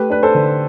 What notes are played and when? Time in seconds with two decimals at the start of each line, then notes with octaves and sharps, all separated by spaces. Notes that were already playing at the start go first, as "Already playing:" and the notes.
Already playing: A3 G4 B4
0.10 D4 B4
0.23 A4 C5
0.35 D3